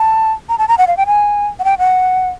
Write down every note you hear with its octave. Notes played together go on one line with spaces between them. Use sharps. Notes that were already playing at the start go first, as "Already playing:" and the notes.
Already playing: A5
A#5
A5
A#5
F#5
F5
G5
G#5
F#5
G5
F#5